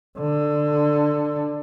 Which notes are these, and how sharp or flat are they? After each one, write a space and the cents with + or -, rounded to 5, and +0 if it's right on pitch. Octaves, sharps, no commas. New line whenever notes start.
D3 +15